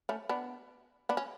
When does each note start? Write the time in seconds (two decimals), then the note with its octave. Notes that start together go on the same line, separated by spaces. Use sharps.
0.09 A3 C#4
0.29 B3 D4
1.09 B3 D4
1.17 C#4